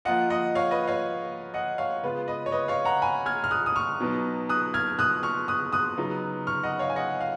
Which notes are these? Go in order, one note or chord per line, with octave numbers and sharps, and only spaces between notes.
F3 A#3 F4 D#5 F#5
D#5 F#5
C#5 F5
B4 D#5
C#5 F5
D#5 F#5
C#5 F5
C#3 G#3 B3 F4 B4
B4 D#5
C#5
B4 D#5
C#5 F5
F#5 A#5
G#5 B5
F6 G#6
F6
D#6 F#6
D#6
C#6 F6
B2 F#3 B3 D#4
D#6 F#6
F6 G#6
D#6 F#6
C#6 F6
D#6 F#6
D#6 F#6
C#3 F#3 B3 D#4
C#6 F6
D#5 F#5
C#5 F5
G#5
D#5 F#5
F5